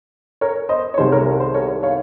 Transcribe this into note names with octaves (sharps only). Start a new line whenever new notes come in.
A#4 C#5
C5 D#5
C#5
C2 C3 D#3 G#3 C5 D#5
A#4 C#5
A#4
C5
A#4 C#5
C#5 F5